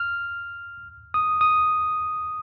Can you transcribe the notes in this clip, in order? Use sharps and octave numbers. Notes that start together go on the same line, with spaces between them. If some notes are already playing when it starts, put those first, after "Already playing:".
Already playing: F6
D#6
D#6